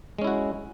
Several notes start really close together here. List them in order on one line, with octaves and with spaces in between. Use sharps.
G#3 C#4 E4 F#4